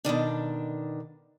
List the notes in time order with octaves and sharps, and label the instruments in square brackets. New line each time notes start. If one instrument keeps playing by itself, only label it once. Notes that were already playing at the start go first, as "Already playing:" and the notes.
[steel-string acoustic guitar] B2 D3 D#3 D4